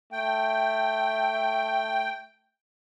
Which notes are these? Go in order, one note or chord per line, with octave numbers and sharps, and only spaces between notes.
A3 G5